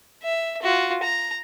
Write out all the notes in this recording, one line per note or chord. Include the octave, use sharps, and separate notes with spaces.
E5
F4 F#4
A#5